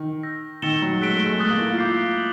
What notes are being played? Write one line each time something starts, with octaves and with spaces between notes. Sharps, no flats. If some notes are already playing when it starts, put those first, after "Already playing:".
Already playing: D#3
E6 G6 A#6
D#3 E6 A6 C#7 E7 G7
F#3
G#3 F#6 B6 D7 G7
A3
G#3
A3 D#6 F#6 A6
A#3
E4
F4
E4 D6 G6 C7
F#7